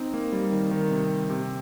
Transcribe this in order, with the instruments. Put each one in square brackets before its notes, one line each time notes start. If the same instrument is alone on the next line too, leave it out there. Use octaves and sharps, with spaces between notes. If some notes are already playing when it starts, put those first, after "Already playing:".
Already playing: [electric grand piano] C4 D#4
A#3
G3
D#3
D#3
C3
C3